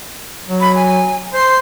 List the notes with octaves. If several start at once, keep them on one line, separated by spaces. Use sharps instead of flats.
F#3
B5
G#5
C5 C6